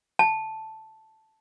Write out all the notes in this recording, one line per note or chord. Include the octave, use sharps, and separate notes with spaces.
A5